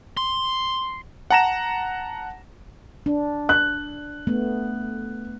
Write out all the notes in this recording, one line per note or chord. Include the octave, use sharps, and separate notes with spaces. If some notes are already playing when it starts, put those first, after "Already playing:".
C6
F#5 A5 A#5 A#6 E7
D4
F#6
A3 B3